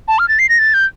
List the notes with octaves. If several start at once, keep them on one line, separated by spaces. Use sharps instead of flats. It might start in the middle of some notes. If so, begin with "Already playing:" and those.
A5
F6
A6
C7
A#6
A6
G6